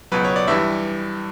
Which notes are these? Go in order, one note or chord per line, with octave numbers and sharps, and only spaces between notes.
C#2 B2 F#3 B4
C#5
D5
G2 E3 G3 E5